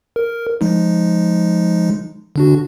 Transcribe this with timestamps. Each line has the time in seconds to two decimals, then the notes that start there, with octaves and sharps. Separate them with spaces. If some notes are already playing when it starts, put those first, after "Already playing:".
0.16 A#4
0.61 F3 G#3 D#4
2.36 D3 D4 F#4